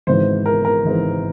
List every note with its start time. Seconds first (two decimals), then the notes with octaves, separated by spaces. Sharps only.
0.07 G#1 G#2 E3 C5
0.46 A#4
0.65 A#4
0.84 G#1 G#2 E3